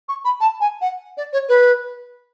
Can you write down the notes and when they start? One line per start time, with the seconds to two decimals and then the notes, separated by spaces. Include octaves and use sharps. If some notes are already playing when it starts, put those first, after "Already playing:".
0.09 C#6
0.25 B5
0.40 A5
0.60 G#5
0.81 F#5
1.17 D5
1.33 C#5
1.49 B4